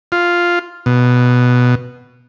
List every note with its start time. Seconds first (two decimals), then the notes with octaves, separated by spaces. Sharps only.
0.12 F4
0.86 B2